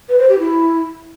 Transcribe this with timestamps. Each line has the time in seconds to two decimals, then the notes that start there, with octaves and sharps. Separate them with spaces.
0.09 B4
0.19 C5
0.29 G4
0.39 E4